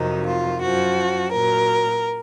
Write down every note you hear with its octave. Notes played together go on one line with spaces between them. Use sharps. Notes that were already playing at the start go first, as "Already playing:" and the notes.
Already playing: F2 C3 D#3 F#3 D#4
F4
F#2 F3 F#4
A#2 F#3 A#4